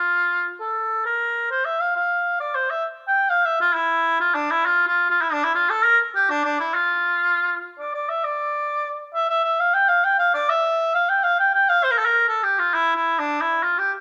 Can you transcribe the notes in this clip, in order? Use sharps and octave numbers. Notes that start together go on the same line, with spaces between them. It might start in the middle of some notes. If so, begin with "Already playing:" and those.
Already playing: F4
A4
A#4
C5
E5
F5
F5
D5
C5
E5
G5
F5
E5
F4
E4
F4
D4
E4
F4
F4
F4
E4
D4
E4
F4
A4
A#4
G4
D4
D4
E4
F4
D5
D5
E5
D5
E5
E5
E5
F5
G5
F5
G5
F5
D5
E5
F5
G5
F5
G5
G5
F5
C5
A#4
A4
A#4
A4
G4
F4
E4
E4
D4
E4
F4
G4